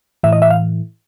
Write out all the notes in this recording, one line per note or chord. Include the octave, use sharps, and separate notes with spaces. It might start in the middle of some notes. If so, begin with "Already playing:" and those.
A2 E3 E5
D#5
E5
F5